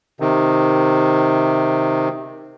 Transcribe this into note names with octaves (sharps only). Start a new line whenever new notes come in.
C3 D#3